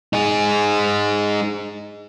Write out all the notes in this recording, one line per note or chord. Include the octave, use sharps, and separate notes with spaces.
D#4 G#4